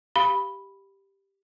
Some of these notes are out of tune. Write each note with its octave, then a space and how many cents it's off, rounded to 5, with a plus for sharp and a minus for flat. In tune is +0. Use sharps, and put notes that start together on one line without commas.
G4 +0 F5 +0 B5 -5